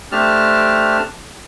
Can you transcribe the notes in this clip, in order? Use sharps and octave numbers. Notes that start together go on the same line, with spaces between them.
A3 C4 D4 G4 A5 F6